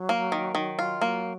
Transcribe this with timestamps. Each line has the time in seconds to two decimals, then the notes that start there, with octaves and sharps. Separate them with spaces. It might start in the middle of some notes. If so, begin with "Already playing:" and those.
Already playing: F#3
0.09 A#3
0.32 D#3
0.55 D#3
0.79 F4
1.01 F#3 A#3